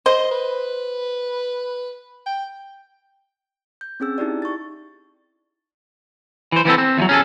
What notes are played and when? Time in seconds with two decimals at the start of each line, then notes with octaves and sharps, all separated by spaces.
0.06 C5 D#5
0.31 B4
2.26 G5
3.81 G6
4.00 C4 C#4 G#4 E6
4.18 D#4 E4 G4 D5
4.42 C#6 A6
6.52 E3 C5
6.65 E3 B3 C4 A4
6.78 C4
6.98 E2 F3 F#3
7.09 C#4 G#4 A4